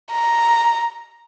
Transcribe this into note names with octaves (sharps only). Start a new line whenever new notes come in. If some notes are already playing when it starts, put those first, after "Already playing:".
A#5